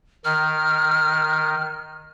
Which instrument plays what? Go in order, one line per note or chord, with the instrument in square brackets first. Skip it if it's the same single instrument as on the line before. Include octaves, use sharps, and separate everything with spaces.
[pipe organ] D#3 [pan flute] F6